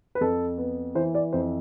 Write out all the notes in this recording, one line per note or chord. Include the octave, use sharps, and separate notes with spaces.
B4
F2 A4
B3
E3 C5
D5
F2 C5